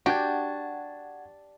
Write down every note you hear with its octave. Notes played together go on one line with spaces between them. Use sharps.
D4 F#4 G4 F#5 G5 G#6